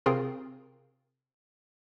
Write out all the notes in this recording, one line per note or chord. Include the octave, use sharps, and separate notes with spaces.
C3 C4 F4 G#4 A#4